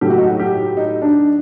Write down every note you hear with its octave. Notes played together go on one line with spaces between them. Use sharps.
A2 F#3 A3 G4
F#4
D#4
F#4
G4
D#4
D4